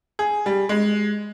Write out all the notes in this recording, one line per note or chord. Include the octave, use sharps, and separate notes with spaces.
G#4
G3
G#3